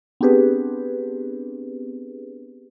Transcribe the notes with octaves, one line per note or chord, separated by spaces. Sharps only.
B3 C4 D4 G4 G#4 B4